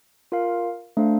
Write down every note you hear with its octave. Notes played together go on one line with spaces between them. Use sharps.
F4 A#4 F5
A3 D4 A4 C5 F5